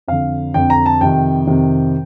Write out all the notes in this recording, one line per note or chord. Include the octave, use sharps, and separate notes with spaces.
F2 D3 F5
F2 D3 G5
A#5
A5
F2 C3 D#3 G5
F2 C3 D#3